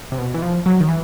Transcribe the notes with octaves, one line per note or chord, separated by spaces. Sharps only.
C3
B2
E3
F3
F#3
D#3
E3